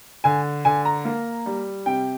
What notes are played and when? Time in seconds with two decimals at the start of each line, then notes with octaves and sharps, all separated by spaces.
0.24 D3 G#5
0.65 D3 G#5
0.85 A#5
1.05 A#3
1.46 G3
1.86 C3 G5